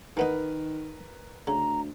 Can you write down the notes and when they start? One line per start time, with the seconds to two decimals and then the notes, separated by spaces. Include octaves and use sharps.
0.17 D#3 E3 B3 D#4 A#4 B4
1.47 D2 C#3 A#5